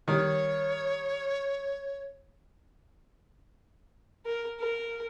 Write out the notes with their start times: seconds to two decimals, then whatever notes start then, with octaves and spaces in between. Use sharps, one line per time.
0.08 D#3 G3 C#5
4.26 A#4
4.60 A#4